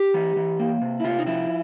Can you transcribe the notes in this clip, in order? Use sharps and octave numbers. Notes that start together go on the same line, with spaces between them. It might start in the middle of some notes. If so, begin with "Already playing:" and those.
Already playing: G4
E3
E3
A#3
C3
E4
C3 F4
D#4
F3 E4